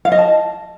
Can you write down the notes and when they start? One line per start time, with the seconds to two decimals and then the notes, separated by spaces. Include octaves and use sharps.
0.05 F5
0.12 D#5
0.18 A5